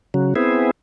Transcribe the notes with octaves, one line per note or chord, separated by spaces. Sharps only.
C#3 F#3
B3 C4 E4 G#4